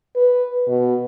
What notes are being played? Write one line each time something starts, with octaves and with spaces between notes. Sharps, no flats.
B4
B2